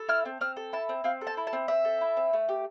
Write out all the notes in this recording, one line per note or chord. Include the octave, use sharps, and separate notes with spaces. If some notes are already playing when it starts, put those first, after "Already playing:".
Already playing: A4
E4 F6
C4
C4 F6
A4
E4 A5
C4
C4 F5
A4
A5
E4
A5
C4
C4 E5
A4
E4
C4
A3
G4